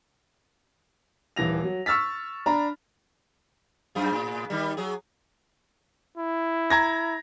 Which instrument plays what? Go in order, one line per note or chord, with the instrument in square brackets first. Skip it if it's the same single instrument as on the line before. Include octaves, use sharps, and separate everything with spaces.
[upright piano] D#1 E3 A#6 F7
F#3
C#6 E6 F6 A6 B6
D4 A#5 B5
[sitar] F#2 F4 G#4
A2
D#3 G3
F#3 G#4
[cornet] E4
[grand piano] A#5 G#6 A#6